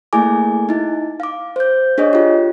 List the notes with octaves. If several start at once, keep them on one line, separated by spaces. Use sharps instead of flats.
A3 A#3 E4 G#4 G#5 D6
D#4 E4
F5 D6
C5 G6
D4 G#4 C#5 D#5
F4 G4